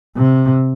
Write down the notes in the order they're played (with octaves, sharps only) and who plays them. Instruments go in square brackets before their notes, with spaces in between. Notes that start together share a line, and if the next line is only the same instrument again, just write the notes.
[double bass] C3